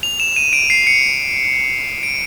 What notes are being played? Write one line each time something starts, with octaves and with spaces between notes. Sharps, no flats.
F7
E7
D#7
D7
C7
C#7
D7